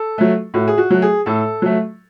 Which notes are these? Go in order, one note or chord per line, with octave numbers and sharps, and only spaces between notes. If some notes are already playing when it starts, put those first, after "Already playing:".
Already playing: A4
F#3 A3
A2 F#4
G#4
F#4
F#3 A3
G#4
A2 A4
F#3 A3